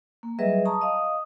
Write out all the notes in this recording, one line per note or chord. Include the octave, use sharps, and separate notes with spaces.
A#3
F#3 G3 G#4 B4 D#5 E5
A5 A#5 C#6 D#6
D#5 F5 D#6